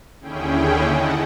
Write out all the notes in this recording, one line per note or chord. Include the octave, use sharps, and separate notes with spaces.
D#2 D3 C#4 E4 G#4 G5
D#5 F#5 A5